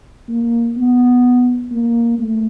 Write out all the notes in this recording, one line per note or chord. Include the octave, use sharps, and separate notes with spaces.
A#3
B3
A#3
A3